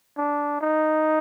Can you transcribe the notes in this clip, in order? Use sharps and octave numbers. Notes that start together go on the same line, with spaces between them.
D4
D#4